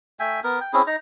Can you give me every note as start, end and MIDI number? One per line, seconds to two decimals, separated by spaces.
0.20 0.40 57
0.20 0.40 76
0.20 0.40 79
0.20 0.40 80
0.44 0.59 59
0.44 0.59 70
0.61 0.72 79
0.73 0.82 60
0.73 0.82 61
0.73 0.82 64
0.73 0.82 68
0.87 0.96 63
0.87 0.96 82